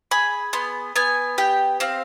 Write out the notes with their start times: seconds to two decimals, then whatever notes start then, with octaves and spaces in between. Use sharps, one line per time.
0.11 G#4 B5
0.53 B3 C6
0.96 B3 G#5
1.38 G4 G5
1.80 C4 F5